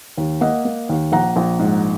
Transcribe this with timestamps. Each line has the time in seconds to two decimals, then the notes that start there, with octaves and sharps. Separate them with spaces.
0.17 D#2
0.41 A#3 D#5 F#5
0.65 A#3
0.89 D#2
1.12 A#1 F#5 A#5
1.36 A#1
1.59 G#2